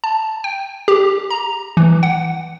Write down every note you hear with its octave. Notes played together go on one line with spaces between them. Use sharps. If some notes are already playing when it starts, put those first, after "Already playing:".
A5
G5
G4
A#5
E3
F#5